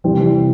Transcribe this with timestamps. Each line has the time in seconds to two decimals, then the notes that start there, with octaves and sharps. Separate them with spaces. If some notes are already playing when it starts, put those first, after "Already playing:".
0.04 C3 E3 G3 C4